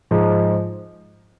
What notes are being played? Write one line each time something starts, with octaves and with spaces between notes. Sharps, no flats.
G#2 F3 G#3